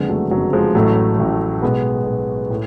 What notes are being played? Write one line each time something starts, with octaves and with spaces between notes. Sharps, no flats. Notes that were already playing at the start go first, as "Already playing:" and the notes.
Already playing: F#1 F2 D3 G#3 B3
F#3 A3
F#1 F2 D3 F#3
F3 G#3
A1 A2 F#3 A3
A1 A2
B1 B2 G#3 B3
B1 B2
A2